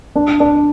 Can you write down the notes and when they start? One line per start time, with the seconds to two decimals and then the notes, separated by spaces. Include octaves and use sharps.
0.16 D4
0.40 D4